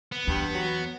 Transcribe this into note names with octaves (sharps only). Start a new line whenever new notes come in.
B3
E2 G2
F#3